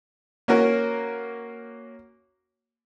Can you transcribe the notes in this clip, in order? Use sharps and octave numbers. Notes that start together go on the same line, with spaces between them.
A#3 C#4 F#4 A#4